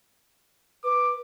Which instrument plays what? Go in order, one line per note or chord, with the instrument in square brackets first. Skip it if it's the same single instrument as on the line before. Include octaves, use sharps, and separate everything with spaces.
[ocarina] B4 [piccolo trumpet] D6